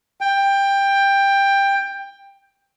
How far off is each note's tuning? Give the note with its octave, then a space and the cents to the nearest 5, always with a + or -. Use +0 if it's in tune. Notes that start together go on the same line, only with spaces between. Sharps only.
G5 +15